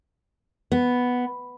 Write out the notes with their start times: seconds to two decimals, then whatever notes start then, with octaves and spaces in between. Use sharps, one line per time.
0.72 B3